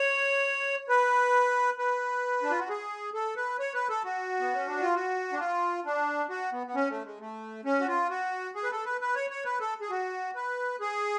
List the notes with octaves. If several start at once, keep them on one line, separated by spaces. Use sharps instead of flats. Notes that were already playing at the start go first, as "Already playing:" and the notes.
Already playing: C#5
B4
B4
D4
F4
F#4
G#4
A4
B4
C#5
B4
A4
F#4
B3
C#4
D4
F4
F#4
D4
F4
D4
F#4
B3
B3
C#4
A3
G#3
A3
C#4
F#4
F4
F#4
G#4
B4
A4
B4
B4
C#5
C#5
B4
A4
G#4
F#4
B4
G#4